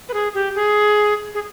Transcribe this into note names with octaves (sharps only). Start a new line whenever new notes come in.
B4
G#4
G4
G#4
G#4